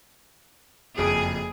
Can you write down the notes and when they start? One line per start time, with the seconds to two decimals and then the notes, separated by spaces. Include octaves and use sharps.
0.98 F#1 F2 G#4 D7